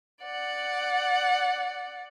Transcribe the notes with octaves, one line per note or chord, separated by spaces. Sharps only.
D5 F#5